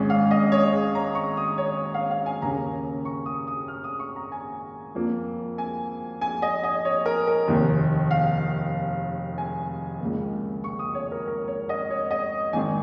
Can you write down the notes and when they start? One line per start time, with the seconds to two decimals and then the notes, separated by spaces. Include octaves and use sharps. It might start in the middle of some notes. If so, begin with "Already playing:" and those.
Already playing: G#1 G#2 G#3 C#4
0.10 F5
0.31 D#5
0.52 C#5
0.73 G#4
0.95 A#5
1.15 C#6
1.37 D#6
1.58 C#5
1.94 F5
2.11 F5
2.26 G#5
2.41 D#2 C#3 A#3 C#4 A#5
3.05 C#6
3.26 D#6
3.47 D#6
3.68 F6
3.84 D#6
3.99 C#6
4.16 A#5
4.32 G#5
4.95 F2 F3 A#3
5.58 G#5
6.21 G#5
6.42 D#5
6.64 D#5
6.85 C#5
7.06 A#4
7.27 A#4
7.48 F1 D#2 D#3
8.11 F5
9.38 G#5
10.00 C#2 C#3 A#3
10.64 C#6
10.79 D#6
10.95 C#5
11.12 A#4
11.27 A#4
11.48 C#5
11.69 D#5
11.90 C#5
12.11 D#5
12.53 G#1 G#2 D#3 G#5